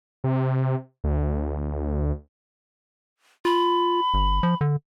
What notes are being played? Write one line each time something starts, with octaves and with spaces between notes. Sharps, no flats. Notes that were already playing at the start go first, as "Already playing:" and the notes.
C3
D2
F4 B5
G1
F3
D3